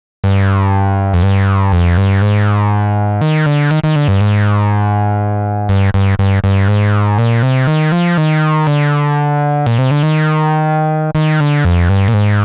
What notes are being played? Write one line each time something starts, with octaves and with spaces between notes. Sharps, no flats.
G2
F2
G2
F2
G2
G#2
D#3
D3
D#3
D#3
D3
G2
G#2
G2
G2
G2
G2
G#2
A#2
C3
D#3
F3
D#3
D3
A#2
C3
D3
D#3
D#3
D3
F2
G2
A#2
G#2